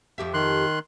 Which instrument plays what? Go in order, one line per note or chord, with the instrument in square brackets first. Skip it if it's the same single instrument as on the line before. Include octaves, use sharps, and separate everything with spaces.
[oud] F2 G4 E5
[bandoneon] D#3 C6 F#6